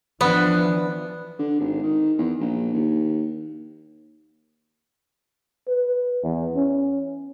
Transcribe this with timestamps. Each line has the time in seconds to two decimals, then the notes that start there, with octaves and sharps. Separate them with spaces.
0.21 E3 F3 B3 D4 B4
1.39 D3
1.60 G#1
1.83 D#3
2.18 E2
2.41 A#1
2.74 D#2
5.68 B4
6.23 E2
6.56 C#4